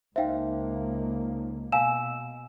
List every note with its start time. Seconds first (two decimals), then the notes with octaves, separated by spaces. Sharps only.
0.16 C#2 A#3 D#4 C5 E5 F5 G5
1.72 B2 F5 G#5 E6 E7